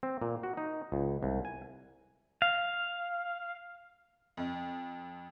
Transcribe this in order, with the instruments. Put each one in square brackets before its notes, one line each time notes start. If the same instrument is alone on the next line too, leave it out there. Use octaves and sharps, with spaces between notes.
[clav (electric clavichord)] C4
A#2
F#4
D#4
C#2
C2
G#5
[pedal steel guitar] F5
[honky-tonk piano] F2